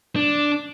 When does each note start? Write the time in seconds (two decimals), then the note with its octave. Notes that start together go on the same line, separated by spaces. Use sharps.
0.16 D4